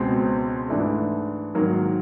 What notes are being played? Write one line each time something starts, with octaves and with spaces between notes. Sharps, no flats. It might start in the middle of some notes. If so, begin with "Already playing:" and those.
Already playing: C#2 B2 G#3 C4
G#2 E3 A3 D4
G#2 D#3 F#3 A#3